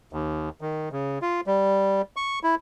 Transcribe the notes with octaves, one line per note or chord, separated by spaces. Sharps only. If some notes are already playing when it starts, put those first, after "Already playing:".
D#2
D#3
C#3
F4
G3
C#6
E4